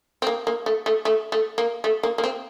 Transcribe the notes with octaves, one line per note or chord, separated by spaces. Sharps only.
C4
A#3
A#3
A3
A3
A3
A3
A#3
A3
A#3
A#3
C4